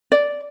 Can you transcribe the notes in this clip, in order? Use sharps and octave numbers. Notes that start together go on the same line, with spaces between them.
D5